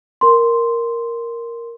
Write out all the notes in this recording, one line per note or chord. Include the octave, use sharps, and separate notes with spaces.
A#4 C6